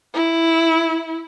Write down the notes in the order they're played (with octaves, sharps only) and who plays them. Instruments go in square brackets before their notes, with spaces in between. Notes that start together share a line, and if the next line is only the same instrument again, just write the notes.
[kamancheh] E4